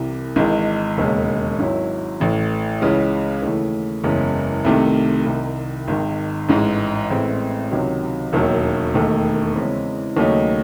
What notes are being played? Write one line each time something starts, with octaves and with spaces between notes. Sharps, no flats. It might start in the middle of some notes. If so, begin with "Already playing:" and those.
Already playing: C2 C3 E3
G#1 G#2 E3 G#3
E1 D#2 C#3 G#3
G#1 G#2 F#3 C#4 E4
A1 A2 E3
C#2 C#3 E3 G#3
D#2 C#3 E3 A3
F#1 E2 C#3 G#3
C2 C3 D#3 A3
C2 C3 D#3
G#1 G#2 D#3
A1 G#2 E3 G#3
A1 A2 G#3 C4 E4
C#2 C3 D#3 F#3
E1 D#2 D#3 F#3
E1 D#2 D#3 A3
E2 C#3 G#3 C4 E4
D#2 C#3 F#3 A3 D#4